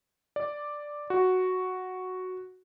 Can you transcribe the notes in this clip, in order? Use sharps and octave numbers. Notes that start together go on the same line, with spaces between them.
D5
F#4